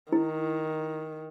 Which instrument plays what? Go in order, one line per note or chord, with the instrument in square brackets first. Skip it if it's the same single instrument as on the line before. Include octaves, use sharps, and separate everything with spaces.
[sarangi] D#3 [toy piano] E4